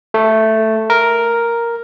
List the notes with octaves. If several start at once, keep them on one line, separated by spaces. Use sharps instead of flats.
A3
A#4